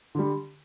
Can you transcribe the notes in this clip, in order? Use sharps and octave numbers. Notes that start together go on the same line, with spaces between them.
D3 G3